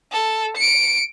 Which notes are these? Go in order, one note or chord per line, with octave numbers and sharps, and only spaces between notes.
A4
C#7 D7